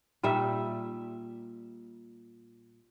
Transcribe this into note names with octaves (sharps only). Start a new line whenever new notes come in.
A#2 G3 D#4 E5